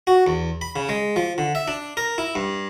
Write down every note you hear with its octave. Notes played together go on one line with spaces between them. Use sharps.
F#4
E2
B5
C#3
G#3
F3
D3
E5
D4
A#4
E4
G2